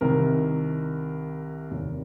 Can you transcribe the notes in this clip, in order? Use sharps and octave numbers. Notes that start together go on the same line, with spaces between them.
C2 C3 D#3 A#4
F1 D#2 D#3